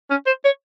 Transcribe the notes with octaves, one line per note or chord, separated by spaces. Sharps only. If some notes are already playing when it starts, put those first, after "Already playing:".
C#4
C5
C#5